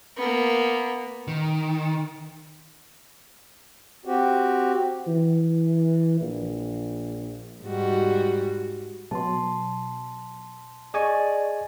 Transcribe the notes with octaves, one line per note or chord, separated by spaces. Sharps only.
A#3 B3
D#3
C4 F#4 G4
E3
A#1
G#2 G3 F#4
B2 F#3 A5 C6
G#4 D5 D#5 G#5 C#6